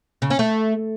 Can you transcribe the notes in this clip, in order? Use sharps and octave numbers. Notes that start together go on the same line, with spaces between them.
C#3
C#4
A3